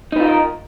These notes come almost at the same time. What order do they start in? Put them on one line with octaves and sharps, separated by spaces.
D#4 B4 F4 D#5 A#4